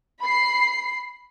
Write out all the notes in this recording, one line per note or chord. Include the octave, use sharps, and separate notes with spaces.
B5 C7